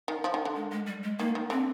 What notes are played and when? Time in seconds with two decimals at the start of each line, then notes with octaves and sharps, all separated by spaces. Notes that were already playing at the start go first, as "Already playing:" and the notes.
0.08 D#3
0.24 F3
0.34 D#3
0.45 D3
0.55 G#3
0.72 G#3
0.87 G3
1.03 G#3
1.19 D#3 A#3
1.35 D#3
1.50 D3 C4